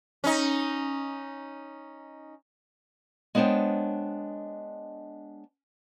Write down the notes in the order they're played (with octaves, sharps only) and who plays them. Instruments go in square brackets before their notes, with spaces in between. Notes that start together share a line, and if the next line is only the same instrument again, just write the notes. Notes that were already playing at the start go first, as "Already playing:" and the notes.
[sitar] C#4 D#4
[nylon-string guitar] G#3 B3 D4 C5 C#5 G5